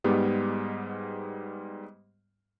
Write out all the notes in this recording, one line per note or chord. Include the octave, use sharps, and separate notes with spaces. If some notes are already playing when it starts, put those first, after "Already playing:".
G#2 G3 G#3 B3 G4